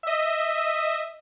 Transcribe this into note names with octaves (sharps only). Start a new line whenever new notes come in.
D#5 E5